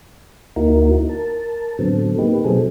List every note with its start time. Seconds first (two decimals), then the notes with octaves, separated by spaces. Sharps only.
0.56 D2 A#3 D#4 E4 F#4 A#4
1.09 A#4 A5
1.79 A2 D3 F#3 B3 C4 A4
2.18 A#3 D#4 G4 B4
2.45 B2 F#3 C4 G#4 A4